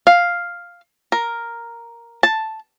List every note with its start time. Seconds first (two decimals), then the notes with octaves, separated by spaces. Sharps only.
0.07 F5
1.12 A#4
2.23 A5